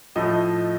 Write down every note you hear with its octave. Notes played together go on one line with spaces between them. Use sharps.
A2 F3 A3 D#5